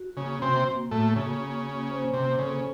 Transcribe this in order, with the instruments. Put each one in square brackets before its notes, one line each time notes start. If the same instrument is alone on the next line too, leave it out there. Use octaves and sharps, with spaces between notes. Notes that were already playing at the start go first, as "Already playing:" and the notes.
Already playing: [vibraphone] F#4
[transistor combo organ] C#3 [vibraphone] A#3
[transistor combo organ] C3 C4 [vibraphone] F#4
[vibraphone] A#3
[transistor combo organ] A2 A3 [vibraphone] F#4
[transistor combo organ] C#3 [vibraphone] A#3
[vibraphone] C#4
C#4
C5
[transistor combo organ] C3 [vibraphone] C#4
[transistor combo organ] C#3 [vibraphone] A4